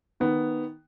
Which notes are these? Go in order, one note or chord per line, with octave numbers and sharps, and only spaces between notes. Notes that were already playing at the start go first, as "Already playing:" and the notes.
D#3 B3